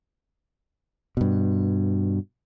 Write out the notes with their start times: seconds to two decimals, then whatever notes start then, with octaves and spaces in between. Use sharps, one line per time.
1.17 G2 B2